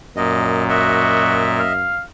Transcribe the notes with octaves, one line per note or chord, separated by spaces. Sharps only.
F#2 A#2 D#5
F#4 D#5 E5
F5